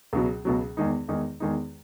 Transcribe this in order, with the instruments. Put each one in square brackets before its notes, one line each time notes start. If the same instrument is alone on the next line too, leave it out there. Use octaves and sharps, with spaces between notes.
[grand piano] C#2 B2 F#3
C#2 B2 F#3
E2 D#3 G#3 D#4
E2 D#3 G#3 D#4
E2 D#3 G#3 D#4